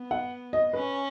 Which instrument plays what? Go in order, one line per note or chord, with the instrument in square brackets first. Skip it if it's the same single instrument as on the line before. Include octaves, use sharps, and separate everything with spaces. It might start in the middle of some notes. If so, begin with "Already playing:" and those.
Already playing: [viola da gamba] B3
[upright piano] F#5
D#5
[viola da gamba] C#4 [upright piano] B4